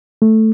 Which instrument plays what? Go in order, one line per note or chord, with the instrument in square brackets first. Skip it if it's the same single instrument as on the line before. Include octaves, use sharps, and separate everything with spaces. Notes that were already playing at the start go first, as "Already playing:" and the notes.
[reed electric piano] A3